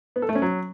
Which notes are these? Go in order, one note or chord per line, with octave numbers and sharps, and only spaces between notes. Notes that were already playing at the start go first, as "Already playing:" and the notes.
B3
A4
A3
C#4
F#3